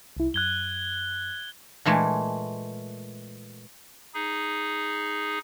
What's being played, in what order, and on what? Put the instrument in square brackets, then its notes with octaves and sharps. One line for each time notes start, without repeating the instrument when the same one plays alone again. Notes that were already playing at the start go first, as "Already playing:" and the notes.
[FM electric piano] C2 E4
[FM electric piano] F#2 [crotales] F#6 G#6 G7
[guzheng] A#2 E3 G#3 A3
[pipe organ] D#4 G#4